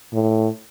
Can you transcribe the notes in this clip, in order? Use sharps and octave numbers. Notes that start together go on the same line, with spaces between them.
A2